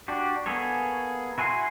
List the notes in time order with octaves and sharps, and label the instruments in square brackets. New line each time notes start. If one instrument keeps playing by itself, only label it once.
[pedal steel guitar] D4 F#4 G4
A#3 B3 G#4 A4 C#5
E4 F#4 G#5 A5 C6